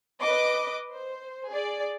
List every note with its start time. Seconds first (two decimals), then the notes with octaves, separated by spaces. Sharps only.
0.21 B4 D#5 D6
0.93 C5
1.50 G#4 D5